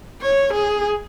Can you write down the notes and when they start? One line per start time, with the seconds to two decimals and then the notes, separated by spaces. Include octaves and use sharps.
0.22 C#5
0.53 G#4